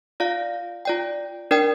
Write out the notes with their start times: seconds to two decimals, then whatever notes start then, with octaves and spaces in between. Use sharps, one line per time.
0.20 F4 D5 F5
0.85 F4 D5 G5
1.51 D4 A#4 D5 G5